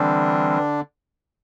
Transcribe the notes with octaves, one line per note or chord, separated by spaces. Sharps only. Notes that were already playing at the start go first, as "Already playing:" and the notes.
Already playing: D3 E3 G3 C4 D4